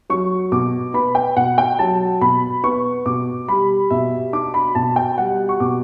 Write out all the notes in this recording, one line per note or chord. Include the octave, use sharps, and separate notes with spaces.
F#3 C#6
B2 D6
B3 B5
G5
B2 F#5
G5
F#3 A5
B2 B5
B3 C#6
B2 D6
G3 B5
B2 E5
D4 D6
B5
B2 A5
G5
G3 F#5
C#6
B2 D6